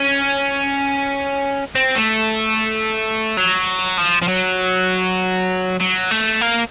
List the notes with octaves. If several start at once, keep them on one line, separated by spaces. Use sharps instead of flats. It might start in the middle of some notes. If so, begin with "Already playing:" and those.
Already playing: C#4
C4
A3
F#3
F3
F3
F#3
F#3
A3
A#3